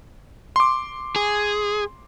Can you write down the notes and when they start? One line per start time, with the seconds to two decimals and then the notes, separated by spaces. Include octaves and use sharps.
0.56 C6 D6
1.16 G#4